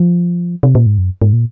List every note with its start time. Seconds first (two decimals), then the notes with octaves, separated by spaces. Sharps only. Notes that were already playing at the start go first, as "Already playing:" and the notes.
Already playing: F3
0.63 C3
0.75 A#2
0.86 G#2
0.98 F#2
1.22 G#2
1.33 A#2